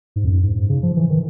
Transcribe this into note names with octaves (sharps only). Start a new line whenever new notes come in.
G#2
F2
F#2
G#2
G#2
C#3
F3
E3
D#3